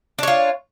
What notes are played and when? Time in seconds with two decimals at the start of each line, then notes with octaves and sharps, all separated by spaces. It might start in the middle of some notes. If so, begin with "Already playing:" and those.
0.19 D4
0.23 C#5
0.28 F4